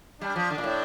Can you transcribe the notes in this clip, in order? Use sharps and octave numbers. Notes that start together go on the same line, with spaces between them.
G3 D4
F3
D3
A#2
A2